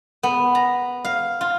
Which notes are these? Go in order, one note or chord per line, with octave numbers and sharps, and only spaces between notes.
B3
A#5
F5
F4